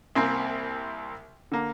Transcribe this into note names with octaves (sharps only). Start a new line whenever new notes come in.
C2 A#3 C4 G#5
D3 A#3